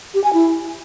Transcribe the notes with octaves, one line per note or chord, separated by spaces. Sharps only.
G4
G#5
E4